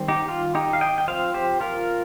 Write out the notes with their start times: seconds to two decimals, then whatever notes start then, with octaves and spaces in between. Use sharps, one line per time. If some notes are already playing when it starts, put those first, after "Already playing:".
Already playing: D#3 G3 C4
0.08 D#4 G4
0.28 F4
0.55 D#4 G4
0.73 F5
0.81 D#5 G5
0.98 G5
1.08 F3 C4 C5 F5
1.34 G4 C5
1.61 F4 A#4